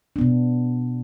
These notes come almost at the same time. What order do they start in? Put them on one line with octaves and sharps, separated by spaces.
D4 B3 B2